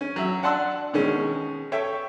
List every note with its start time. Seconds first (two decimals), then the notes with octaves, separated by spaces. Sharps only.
0.01 C#4
0.16 F#3 E5
0.43 D4 F#5 A5 C6 E6
0.93 B2 D#3 G#3 C#4
1.72 A4 C#5 E5 G5